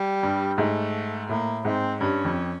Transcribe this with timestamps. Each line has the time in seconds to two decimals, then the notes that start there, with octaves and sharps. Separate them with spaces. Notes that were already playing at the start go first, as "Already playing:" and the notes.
Already playing: G3
0.23 G2
0.58 G#2 A3
1.29 A2 A#3
1.65 G#2 C4
2.01 G2 C#4
2.24 F2